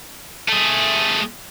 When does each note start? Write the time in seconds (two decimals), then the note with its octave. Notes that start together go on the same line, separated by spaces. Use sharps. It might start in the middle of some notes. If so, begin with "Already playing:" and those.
0.49 A3 G#4